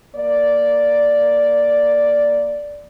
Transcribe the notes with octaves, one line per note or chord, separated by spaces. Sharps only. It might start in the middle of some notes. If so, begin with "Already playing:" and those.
A#3 D5